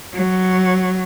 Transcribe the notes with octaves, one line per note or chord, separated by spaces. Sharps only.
F#3